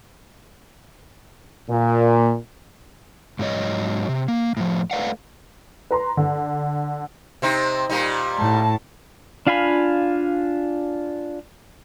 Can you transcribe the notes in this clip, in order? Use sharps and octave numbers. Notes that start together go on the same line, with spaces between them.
A#2
G#2 F#3 D4 C#5 D#5
C3
A#3
A2 F3
A3 B4 D5 F5 F#5
B4 A#5 C6
D3
C3 C4 D#4
A#2 G3 D#4
A2 A5
D4 F4 F5 G#5 B5